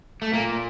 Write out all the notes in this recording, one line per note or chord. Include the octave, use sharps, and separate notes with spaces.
A3
A#2 A#3